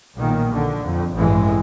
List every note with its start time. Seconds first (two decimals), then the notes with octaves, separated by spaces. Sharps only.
0.16 B1 A#2 D#3
0.52 A#1 D3
0.82 F2
1.14 A1 G2 E3 G#3